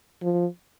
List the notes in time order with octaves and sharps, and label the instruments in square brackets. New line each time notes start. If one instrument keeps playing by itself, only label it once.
[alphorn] F3